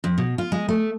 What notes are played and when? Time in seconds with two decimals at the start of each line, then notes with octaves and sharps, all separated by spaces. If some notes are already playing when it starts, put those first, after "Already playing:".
0.04 F2
0.18 B2
0.38 F4
0.52 G#3
0.69 A3